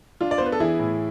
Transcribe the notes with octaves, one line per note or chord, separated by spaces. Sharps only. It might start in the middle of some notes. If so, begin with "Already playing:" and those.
D4 F4
D5
B3 C5
B4
A4
E3 E4 G#4
A2